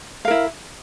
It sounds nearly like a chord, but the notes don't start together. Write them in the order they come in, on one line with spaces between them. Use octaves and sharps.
F5 A#4 E4